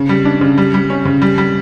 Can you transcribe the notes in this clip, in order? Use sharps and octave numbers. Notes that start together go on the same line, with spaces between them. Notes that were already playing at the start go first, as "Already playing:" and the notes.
Already playing: C#3
G3
D4
C#3
G3
G3
C#4
C#3
G3
G3